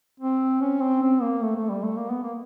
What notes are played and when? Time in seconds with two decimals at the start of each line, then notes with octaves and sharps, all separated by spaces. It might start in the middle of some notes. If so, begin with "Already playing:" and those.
0.20 C4
0.61 C#4
0.81 C4
1.02 C4
1.22 A#3
1.43 A3
1.56 A3
1.69 G3
1.84 A3
1.96 A#3
2.10 B3
2.23 A#3